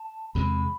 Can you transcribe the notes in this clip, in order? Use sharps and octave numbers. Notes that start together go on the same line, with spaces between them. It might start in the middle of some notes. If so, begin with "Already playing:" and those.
Already playing: A5
E2 C3 G#3 B5